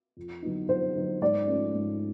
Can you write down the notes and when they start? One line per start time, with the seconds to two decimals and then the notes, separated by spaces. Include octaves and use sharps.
0.17 F2
0.42 D3 F#3 B3 D#4
0.69 F2 C5
0.95 D3 F#3 B3 D#4
1.22 G#2 D5
1.47 F3 A3 C#4
1.74 G#2